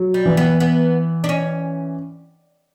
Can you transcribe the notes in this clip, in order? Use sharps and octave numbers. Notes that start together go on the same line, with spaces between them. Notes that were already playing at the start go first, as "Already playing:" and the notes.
Already playing: F#3
G3
E3
B3
B3
D4
C#4